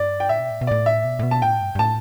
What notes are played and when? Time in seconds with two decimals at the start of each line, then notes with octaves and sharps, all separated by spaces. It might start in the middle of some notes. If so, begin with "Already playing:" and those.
Already playing: G2 D5
0.20 G5
0.29 A2 E5
0.40 B2
0.51 A2
0.61 B2
0.67 A2 D5
0.86 E5
1.04 B2
1.19 A2
1.23 B2
1.31 A5
1.42 A2 G5
1.61 G2
1.75 G2
1.79 A2 A5